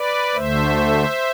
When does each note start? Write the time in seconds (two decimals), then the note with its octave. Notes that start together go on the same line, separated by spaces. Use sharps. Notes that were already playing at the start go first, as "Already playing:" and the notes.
Already playing: B4 D5
0.35 D2 D3 A3 C5 E5